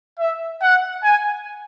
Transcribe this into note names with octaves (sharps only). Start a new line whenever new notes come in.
E5
F#5
G#5